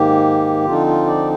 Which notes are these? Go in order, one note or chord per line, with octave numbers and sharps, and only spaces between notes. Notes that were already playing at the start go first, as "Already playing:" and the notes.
Already playing: G#2 D#3 A#3 G4
D3 F3 C4 D#4 F4
F4
D5